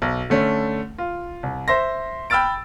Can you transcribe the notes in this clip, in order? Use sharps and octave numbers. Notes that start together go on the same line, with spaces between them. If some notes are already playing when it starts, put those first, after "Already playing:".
B1
D3 A3 C#4
F4
C2
C5 E5 C6 A#6
G5 B5 E6 F6 A6 D7